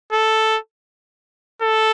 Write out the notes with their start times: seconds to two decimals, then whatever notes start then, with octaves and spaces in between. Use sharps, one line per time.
0.13 A4
1.61 A4